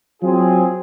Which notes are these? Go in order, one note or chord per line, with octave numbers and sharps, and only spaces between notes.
F#3 C4 F4 G#4